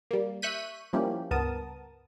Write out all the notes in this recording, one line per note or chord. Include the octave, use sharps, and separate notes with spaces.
G3 A#3
E5 C#6 F#6 G6 B6 D#7
F3 G3 A#3 C#4 E4 G4
C#2 G2 B3 A#4 A5 D#6